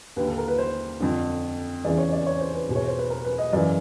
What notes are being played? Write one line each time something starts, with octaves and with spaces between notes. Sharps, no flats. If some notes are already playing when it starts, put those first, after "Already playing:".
D#2 D3 B4
A4
A#4
B4
C5
F2 D3
E2 C#3 E3 D5
C#5
D5
C#5
C5
B4
E2 B2
C#5
C5
B4
A#4
B4
D#5
F#2 C#3 E3 D5